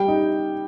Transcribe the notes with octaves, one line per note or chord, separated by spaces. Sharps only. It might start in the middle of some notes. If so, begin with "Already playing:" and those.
Already playing: G3 G5
D#4